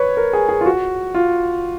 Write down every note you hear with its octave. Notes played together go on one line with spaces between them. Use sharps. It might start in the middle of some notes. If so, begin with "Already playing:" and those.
Already playing: B4 C#5
A#4
G#4
G#4
F4
F#4
F4